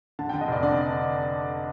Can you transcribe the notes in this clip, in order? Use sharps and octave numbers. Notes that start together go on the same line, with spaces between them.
D3 A5
D3 G5
D#5
F1 D5
D3 D5